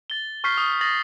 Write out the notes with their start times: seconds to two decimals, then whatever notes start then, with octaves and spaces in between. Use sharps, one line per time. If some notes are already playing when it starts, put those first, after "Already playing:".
0.10 A6 G7
0.44 C#6 F6 G6 B6 C7
0.58 D#6
0.81 D#6 A6 A#6 F#7